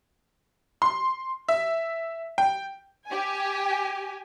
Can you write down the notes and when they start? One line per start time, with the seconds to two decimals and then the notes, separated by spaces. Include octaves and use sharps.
0.82 C6
1.48 E5
2.38 G5
3.08 G4 G#5